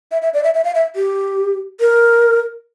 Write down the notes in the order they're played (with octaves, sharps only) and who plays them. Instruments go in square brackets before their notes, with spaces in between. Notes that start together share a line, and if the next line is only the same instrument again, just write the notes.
[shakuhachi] E5
E5
D5
E5
E5
F5
E5
G4
A#4